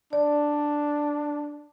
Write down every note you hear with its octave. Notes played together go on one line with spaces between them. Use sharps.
D4 D5